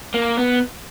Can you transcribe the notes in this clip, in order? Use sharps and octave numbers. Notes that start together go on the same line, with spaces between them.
A#3
B3